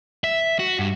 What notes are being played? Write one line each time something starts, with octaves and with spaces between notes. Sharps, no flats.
E5
F#4
G2